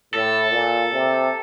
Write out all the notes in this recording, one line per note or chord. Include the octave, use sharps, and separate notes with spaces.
A2 A4
A#2
C3